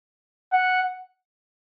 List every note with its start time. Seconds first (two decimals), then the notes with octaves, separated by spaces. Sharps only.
0.53 F#5